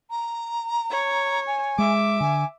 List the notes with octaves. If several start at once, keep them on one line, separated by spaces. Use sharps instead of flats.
A#5
C#5
G#5
G#3 E5 D6
D3 G#5